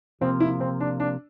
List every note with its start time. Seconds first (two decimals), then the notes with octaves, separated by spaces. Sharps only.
0.21 C3 F3 A#3 C4 F4
0.40 E4
0.60 C4
0.80 D4
1.00 D4